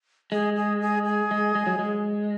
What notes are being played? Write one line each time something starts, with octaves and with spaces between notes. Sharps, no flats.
G#3 G#4
G#4
G#4
G#4
G#3
G#3
F#3
G#3